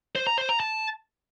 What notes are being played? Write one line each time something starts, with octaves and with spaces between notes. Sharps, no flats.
C5
A#5
C5
A#5
A5